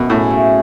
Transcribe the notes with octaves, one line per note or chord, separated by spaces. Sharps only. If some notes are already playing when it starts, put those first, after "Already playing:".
Already playing: F#2 B2
A2 C#3
A3